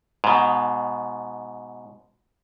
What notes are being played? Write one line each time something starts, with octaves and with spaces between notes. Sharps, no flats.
G#2 B2